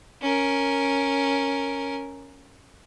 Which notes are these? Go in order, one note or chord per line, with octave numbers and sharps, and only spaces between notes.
C#4 A#4